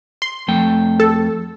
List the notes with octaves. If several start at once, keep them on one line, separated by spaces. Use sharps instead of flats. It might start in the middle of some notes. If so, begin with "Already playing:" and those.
C6
F2 A3 G5
A4